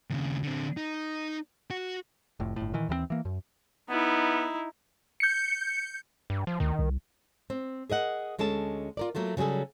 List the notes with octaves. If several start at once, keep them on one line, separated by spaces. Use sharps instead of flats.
D#2 C#3
D3 C4
D#4
F#4
F1 A2
G1 A2
A#2 D#3 E3
D#2 E3 F3 C4
E3 A#3
F#2
B3 D#4 E4
G6 C#7
G2
F3
D2 D#3
C2
C4
G#4 A#4 D#5 F#5
D2 G#3 C#4 A4 A5
F4 A#4 D5
F#3 A3 A#3 F4
C#3 F#3 G3 G#4 A4